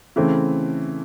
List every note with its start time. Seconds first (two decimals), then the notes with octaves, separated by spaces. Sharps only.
0.16 C#3 E3 A3 C4